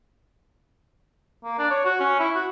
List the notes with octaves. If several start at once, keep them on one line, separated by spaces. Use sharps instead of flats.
A#3
D4
C#5
F#4
C#4
E4
F#4